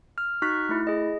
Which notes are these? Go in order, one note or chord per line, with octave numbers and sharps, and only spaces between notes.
F6
D#4 F#4 C#6 F6 F#6 B6
A3 E4
G#4 D#5